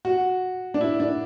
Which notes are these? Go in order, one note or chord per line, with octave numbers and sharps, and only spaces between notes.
F#4
D4
E4
D4